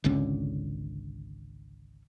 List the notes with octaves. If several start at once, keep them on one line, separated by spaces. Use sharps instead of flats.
G#1 C#2 D3 C#4